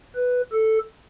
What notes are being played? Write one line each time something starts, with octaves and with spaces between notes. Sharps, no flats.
B4
A4